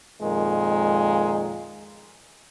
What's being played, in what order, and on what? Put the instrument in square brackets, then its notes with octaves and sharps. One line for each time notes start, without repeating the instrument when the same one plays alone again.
[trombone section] F2 A#2 D#3 G#3